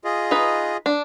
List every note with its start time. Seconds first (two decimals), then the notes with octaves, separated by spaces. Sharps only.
0.04 F4 G#4 D#5
0.31 D#4 B4
0.86 D4